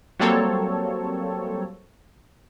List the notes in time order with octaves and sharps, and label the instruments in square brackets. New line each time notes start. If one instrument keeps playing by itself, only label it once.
[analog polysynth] F#3 G3 A#3 C4 A4 C#5